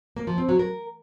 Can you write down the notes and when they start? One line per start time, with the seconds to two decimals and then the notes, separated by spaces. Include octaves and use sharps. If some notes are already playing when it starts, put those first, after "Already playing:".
0.17 A#3
0.27 F3
0.38 C4
0.49 F#3
0.59 A#4